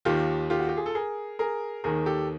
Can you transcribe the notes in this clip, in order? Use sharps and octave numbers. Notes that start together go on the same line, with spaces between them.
D#2 D#3 F4 G4
F4 G4
F#4
G4
G#4
A4
G#4 A#4
G#4 A#4
D#2 D#3 G#4 A#4
G4 A4